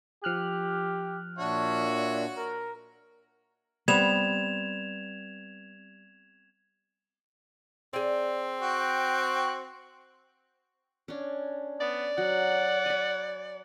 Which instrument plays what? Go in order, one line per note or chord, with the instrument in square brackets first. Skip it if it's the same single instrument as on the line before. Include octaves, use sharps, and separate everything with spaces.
[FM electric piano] F3 F6 F#6 [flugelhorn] G4
[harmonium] A#2 D4 [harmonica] F#4 C#5 [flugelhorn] E5
[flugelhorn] A#4
[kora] G3 B3 C4 [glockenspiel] G#6 E7 F7
[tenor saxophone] C4 [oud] G#4 D5
[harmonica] F#4 G5
[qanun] C#4 D4
[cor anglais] B3 [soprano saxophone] D5
[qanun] F#3 [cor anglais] F#5
[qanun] G#5 B5